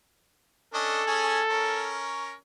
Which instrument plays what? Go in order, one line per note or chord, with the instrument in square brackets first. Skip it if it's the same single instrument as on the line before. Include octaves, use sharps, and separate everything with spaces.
[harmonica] C#4 D4 D#5 [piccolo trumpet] A4
[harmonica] C#4 G#4 G#5
C#4 A#4 C#5